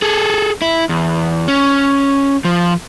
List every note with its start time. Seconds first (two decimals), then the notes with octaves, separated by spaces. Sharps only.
0.02 G#4 A4
0.62 E4
0.89 E2
1.48 C#4
2.45 F3